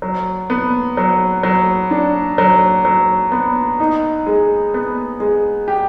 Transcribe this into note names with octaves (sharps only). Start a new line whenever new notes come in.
F#3
B3
F#3
F#3
D4
F#3
F#3
B3
D#4
G#3
B3
G#3
G4